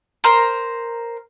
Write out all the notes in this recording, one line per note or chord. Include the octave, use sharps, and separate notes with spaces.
A#4 C5